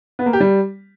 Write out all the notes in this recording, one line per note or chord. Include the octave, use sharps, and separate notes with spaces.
B3
A#3
G4
G3